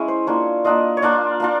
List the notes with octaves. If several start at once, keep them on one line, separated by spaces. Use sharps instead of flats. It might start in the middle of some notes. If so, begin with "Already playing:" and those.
Already playing: G#3 C#4 E4
C5
A#3 D4 F4 C#5
A#3 D4 F4 D#5
C#5
A#3 D4 F4 D5
A#3 D4 F4